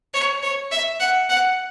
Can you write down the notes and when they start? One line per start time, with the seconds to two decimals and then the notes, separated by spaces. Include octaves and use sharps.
0.14 C#5
0.43 C#5
0.71 E5
1.00 F#5
1.29 F#5